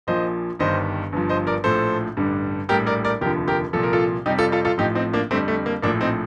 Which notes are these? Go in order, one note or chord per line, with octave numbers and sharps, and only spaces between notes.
A#1 A#2 F3 C5 D#5
G1 G2 D#3 G3 C5 D#5
G1 G2 F3
C5 D#5
A#4 D5
A#1 A2 F3 A4 C5
A1 G2 D3 G3
A#1 A2 G3 G4 A#4
A#4 D5
A#4 D5
F1 D#2 D3 F3 G4 A#4
G4 A#4
C2 A#2 F3 A4
A#4
F4 A4
F2 C3 G3 D#4 G4
F4 A4
F4 A4
F4 A4
A1 A2 F3 D#4 G4
C4 D#4
A#3 D4
F2 D3 G3 A3 C4
A3
A#3
A#1 A2 F3 A#3 D4
C4 D#4